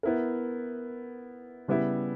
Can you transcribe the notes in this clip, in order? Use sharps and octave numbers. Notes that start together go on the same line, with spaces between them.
B3 E4 A#4
C#3 G3 B3 E4